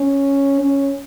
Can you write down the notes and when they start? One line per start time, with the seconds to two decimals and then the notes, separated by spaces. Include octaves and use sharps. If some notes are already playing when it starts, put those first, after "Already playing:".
Already playing: C#4
0.61 C#4